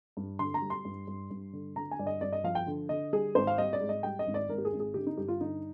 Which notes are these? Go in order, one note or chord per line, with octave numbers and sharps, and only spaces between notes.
G2
D3 C6
A#5
G3
C6
G2
G2
G2
D3
D3 A#5
G#5
G2 D5
D#5
G2 D5
D#5
F3 F5
G5
D3
D3 D#5
G3 G#4
G#1 C5
F5
G3 D#5
D5
G#2
D#5
G3 G5
D#5
G#1
D5
G#1 A#4
G4
G#4
G#1
G#4
D3 G4
D#4
G2 G4
F4
D3 D#4